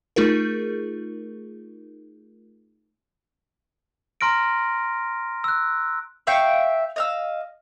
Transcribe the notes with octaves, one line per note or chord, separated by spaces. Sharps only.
A3 D#4 F4 G#4 A#4
A#5 C6 F6 A#6 D7
E6 F#6
E5 F5 G5 C#6
D#5 F5 E6